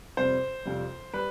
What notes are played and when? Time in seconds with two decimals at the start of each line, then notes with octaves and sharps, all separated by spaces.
0.17 F2 C3 G3 C5
0.65 F2 C3 G3
1.14 G3 B4